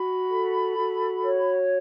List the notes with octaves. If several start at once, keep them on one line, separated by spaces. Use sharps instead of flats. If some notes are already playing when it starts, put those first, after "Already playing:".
Already playing: F#4 B5
A4
F#4
C#5